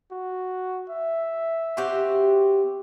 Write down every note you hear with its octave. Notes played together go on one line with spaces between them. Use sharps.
F#4
E5
C4 F#4 G4